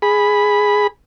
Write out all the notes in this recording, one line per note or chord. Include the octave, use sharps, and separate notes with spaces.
G#4 B5